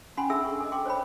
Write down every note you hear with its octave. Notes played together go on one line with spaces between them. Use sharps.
C#4 F#5 G#5 B5 C6
D4 G#4 A4 E5 E6
C#6
A4 D#5
G5 C6 D6
C5 C#5 G5 B5